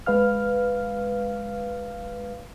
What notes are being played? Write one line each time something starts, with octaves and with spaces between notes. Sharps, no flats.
G#3 B4 F5 F6